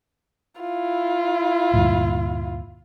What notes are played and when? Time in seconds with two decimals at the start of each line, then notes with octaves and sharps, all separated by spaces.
0.61 E4 F4
1.74 D2 G2 A#2